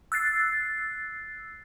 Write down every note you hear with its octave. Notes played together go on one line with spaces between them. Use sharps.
E6 F#6 A6 C7